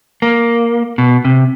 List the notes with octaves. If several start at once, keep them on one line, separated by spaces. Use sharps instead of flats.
A#3
B2
C3